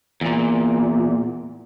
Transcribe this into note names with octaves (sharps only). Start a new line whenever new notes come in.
E2 A#2